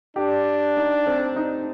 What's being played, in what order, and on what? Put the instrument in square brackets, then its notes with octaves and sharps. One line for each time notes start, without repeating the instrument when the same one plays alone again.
[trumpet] D4 [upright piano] G4
[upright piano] D#4
C4
D#4